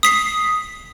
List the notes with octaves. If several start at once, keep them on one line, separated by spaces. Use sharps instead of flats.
D#6 B6 C7